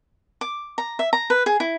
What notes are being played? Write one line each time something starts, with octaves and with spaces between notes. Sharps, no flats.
D6
A#5
E5
A#5
B4
G#4
E4